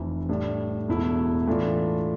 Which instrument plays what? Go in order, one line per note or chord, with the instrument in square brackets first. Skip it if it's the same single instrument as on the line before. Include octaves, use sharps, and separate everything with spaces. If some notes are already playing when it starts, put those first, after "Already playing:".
Already playing: [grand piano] F1 F2 C3 E3
A2 G3 D4
E1 E2 B2 A3 E4
A2 E3 A3 D4 F4